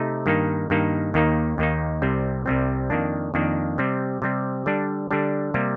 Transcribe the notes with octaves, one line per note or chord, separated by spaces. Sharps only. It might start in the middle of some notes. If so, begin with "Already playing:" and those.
Already playing: C3 A3 D#4
G2 D#3 A#3 D#4
G2 D#3 A#3 D#4
D#2 D#3 A#3 D#4
D#2 D#3 A#3 D#4
C2 C3 G3 C4
C2 C3 G3 C4
F2 D#3 A#3 D4
F2 D#3 A#3 D4
C3 G3 C4
C3 G3 C4
D3 G3 D4
D3 G3 D4
C3 G3 A#3